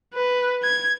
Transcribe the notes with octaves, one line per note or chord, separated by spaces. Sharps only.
B4
G#6